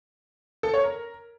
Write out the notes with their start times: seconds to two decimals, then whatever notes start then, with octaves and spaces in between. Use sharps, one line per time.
0.63 A4
0.74 C#5
0.84 A#4